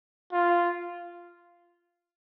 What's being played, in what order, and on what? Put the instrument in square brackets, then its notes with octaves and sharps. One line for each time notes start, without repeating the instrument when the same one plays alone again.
[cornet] F4